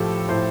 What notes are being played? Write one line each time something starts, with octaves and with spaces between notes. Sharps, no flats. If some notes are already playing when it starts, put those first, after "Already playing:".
Already playing: A2 F3 G4 A4
A2 C5